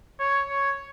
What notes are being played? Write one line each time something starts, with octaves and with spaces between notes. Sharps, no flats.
C#5
C#5